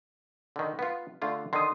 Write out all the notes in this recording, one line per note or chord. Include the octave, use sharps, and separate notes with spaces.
D3 D#3
B3 F4
D3 A3 F4
D3 D#3 C6 D#6